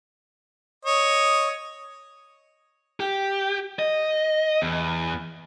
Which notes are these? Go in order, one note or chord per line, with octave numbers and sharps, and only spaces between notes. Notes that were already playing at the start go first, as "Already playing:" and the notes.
C#5 D#5
G4
D#5
E2